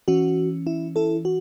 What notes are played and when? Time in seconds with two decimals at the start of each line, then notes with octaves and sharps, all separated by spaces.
0.08 E3 C#4 F#4
0.67 E4
0.96 E4 A4
1.25 F#4